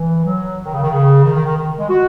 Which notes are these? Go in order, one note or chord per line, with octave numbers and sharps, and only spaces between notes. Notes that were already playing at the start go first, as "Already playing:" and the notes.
Already playing: E3
F#3
D#3
C#3
D#3
C#3
D#3
D#3
D#3
D#3
G#3
F#4